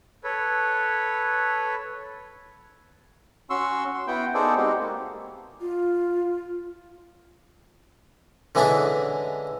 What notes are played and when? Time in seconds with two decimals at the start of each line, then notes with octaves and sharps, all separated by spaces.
0.24 A4 B4 C#5
3.50 C#4 F#4 C6 C#6 E6
3.94 C6
4.07 B3 E4 F#4 G5
4.34 B3 D#4 G#4 A4 C5 D5
4.57 G#3 C4 D#4 F#4 G4
4.79 A#3
5.61 F4
8.55 D3 E3 G#3 C#4 D4 E4